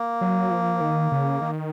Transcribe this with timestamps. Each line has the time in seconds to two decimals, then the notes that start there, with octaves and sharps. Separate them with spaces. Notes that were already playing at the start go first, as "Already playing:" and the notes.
Already playing: A#3
0.21 F#3
0.51 F3
0.81 D#3
1.12 C#3
1.41 D#3